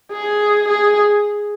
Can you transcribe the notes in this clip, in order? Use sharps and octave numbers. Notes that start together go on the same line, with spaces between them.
G#4
G#4